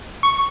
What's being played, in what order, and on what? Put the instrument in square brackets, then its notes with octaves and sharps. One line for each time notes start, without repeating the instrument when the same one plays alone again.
[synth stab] C#6